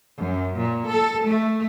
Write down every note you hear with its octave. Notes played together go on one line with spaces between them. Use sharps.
F#2
A#2
A4
A3